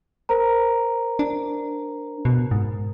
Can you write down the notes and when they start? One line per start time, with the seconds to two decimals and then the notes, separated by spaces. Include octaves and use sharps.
0.29 A#4 C5 A#5
1.19 D4
2.25 B2
2.51 G#2